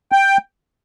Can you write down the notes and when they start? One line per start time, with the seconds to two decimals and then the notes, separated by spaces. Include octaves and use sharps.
0.12 G5